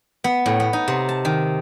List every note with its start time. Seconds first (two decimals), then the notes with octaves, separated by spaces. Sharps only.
0.24 B3
0.46 A2
0.60 B3
0.73 D#4
0.88 C3
1.09 A5
1.25 D#3